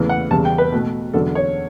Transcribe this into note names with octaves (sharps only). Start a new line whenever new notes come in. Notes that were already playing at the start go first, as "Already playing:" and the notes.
Already playing: E2 C#3 E3 A3
F#5
E2 C#3 G3 A5
G5
B4
B2 A3
E2 D3 F#3 A4
C#5